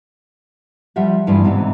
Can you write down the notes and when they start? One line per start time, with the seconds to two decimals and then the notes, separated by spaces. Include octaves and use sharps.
0.96 F3 G3 F4 E5 F#5
1.27 D2 G2 E3 F3 E4 F4
1.44 G#2 C3 E3 B3 F4